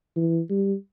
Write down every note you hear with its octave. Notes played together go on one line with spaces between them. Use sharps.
E3
G3